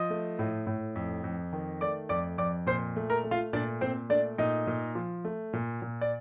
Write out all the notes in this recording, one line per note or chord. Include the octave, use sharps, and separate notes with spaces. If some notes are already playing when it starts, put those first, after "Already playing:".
Already playing: F3 D#5 D#6
A3
A2
A2
F2
F2
D#3
A3 D5 D6
F2 D5 D6
F2 D5 D6
A#2 C5 C6
A3
A#4 A#5
A3
F4 F5
A#2 D4 D5
A#2 C4 C5
A3 D4 D5
A#2 D#4 D#5
A#2
F3
A3
A#2
A#2
D5